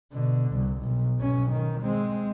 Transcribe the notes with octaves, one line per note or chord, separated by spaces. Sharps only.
B2 D3
C2
B1
B1 C#4
D#3
G#3 C4